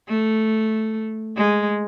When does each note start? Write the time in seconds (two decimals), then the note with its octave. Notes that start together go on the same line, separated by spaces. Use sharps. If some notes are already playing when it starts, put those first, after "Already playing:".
0.08 A3
1.37 G#3